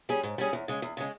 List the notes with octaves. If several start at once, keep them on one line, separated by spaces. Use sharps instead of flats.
G3 C#4 G#4
G#2
G3 C#4 G#4
E2
C#3 G#3
E2
C#3 G#3